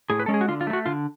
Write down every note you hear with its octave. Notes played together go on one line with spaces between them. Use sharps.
A2 G#4
B4
G#3 C#4 A4
G#4
F#4
D3 F4
F4
F#3 A3
F#4
D3 F4